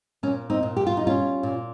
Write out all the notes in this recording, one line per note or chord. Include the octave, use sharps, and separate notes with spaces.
A#2 C#4
C4 D#4
A#2
G4
F4
D#4
G3 C#4 F4
A#2